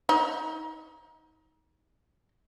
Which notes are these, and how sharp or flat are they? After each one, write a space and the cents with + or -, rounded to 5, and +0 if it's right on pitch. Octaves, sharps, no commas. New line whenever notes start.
D#4 +25